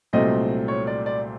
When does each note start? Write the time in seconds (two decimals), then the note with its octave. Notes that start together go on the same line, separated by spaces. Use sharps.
0.13 C2 A#2 F#3 A3 C4 D#5
0.68 C#5
0.87 D5
1.06 D5